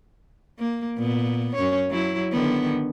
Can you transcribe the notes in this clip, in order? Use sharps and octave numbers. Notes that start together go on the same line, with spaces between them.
A#3
A#2 B3
F#2 C#4 C#5
F#3 E4
D3 D#3 B3